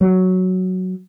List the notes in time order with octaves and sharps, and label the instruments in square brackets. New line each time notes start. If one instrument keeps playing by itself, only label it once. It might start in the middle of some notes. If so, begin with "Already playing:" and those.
[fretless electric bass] F#3